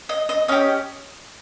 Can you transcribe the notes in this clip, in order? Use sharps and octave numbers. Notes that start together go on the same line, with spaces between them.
D#5
D#5
C#4 G4 D#5